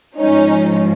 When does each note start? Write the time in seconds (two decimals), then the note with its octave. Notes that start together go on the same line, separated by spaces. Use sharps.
0.17 G#2 F3 G#3 C#4 D#4